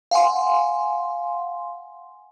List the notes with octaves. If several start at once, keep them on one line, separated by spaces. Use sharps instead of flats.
F5 F#5 G#5 C6